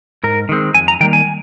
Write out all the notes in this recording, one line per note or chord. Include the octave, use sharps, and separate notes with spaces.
G#2 A#4
D#3 G#3 C4
F2 G#5
A#5
D#3 G3 A#3 G5
G#5